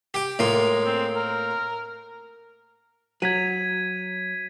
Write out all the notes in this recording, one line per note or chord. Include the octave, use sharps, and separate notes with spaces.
G4 G5
A2 G#3 A#3 F4
C4
A#4
F#3 G#6 B6 D#7